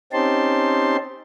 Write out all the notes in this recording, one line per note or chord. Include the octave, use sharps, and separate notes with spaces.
C4 C#4 D#4 G4 A5 C6